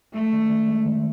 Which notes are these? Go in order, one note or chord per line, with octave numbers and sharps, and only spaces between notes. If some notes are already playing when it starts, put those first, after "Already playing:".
G#3 A3
D#3
D#3
G#3
D#3